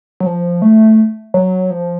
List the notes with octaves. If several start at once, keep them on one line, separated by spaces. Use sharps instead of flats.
F#3
F3
A3
F#3
F3